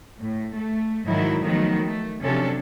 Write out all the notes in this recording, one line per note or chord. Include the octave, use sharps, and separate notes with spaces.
A2
A3
G#2 D#3 F3 F#3 E4
D#3 F3 F#3 A3 B3
A3
C3 F3 F#3 C#4 D4 A4